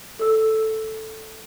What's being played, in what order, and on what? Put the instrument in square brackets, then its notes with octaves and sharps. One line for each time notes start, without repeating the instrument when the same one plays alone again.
[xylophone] A4 E6